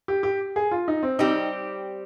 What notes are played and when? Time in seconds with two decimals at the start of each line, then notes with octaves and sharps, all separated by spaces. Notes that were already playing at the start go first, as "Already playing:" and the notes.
0.08 G4
0.23 G4
0.56 G#4
0.71 F4
0.88 D#4
1.03 C4
1.19 G3 C4 D#4 G4